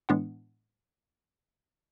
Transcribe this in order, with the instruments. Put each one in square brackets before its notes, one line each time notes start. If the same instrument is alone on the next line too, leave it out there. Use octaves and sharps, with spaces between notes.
[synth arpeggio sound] A2 E3 G#3 B3 D4 F#5